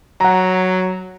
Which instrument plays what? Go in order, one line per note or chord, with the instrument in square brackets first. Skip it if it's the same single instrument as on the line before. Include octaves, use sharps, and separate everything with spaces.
[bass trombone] F#3 [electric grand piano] F#5 A#5